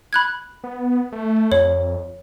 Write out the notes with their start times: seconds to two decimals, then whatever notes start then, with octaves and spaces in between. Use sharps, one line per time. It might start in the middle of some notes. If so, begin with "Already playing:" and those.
0.13 B5 F#6 G#6
0.64 B3
1.12 A3
1.52 F2 C#5